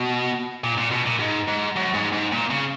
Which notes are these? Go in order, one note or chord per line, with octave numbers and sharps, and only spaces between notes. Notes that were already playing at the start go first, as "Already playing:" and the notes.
Already playing: B2
A#2
A#2
B2
A#2
G#2
G#2
F#2
G#2
G#2
A#2
C#3